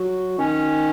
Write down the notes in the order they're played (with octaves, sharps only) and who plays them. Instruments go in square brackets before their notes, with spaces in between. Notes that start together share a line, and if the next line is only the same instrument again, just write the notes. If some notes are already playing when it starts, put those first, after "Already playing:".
Already playing: [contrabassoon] F#3
[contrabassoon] D#3 [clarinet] C#4